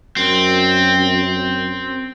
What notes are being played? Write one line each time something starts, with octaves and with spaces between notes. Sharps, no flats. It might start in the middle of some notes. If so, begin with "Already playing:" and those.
F#2 C4